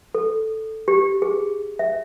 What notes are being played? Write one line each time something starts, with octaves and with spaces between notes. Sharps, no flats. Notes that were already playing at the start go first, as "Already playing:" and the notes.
A4
G4
G#4
E5